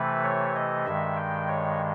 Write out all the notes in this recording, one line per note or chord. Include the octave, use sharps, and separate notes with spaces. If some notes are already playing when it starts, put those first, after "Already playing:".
Already playing: C3 E3 A3 B4
C#5
D#5
G2 D#3 G#3 E5
G5
C#5